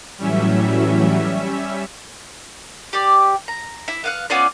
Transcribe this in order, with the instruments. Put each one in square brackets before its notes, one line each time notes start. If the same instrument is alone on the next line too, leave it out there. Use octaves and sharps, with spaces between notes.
[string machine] A2 E3 F#3 [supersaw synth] G3 C#4 E5
[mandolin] G4 D5
A#5
E4
B3 F5 F#5
B3 C#4 F4 D5